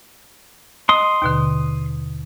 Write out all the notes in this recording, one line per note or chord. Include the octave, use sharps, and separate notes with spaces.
D#5 C6 D#6
D#2 B2 D3